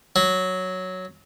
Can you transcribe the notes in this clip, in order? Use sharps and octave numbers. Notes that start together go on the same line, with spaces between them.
F#3